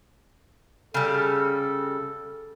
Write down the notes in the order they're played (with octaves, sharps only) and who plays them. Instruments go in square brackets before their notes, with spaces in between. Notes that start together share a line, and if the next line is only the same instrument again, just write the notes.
[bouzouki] C#3 G3 [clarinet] A4